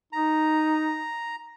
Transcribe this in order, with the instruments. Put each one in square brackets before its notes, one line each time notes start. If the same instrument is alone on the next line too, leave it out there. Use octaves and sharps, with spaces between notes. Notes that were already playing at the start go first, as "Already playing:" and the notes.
[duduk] D#4 [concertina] A#5